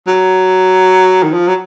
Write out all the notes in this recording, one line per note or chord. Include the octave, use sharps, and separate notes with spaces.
F#3
D#3
F3
F#3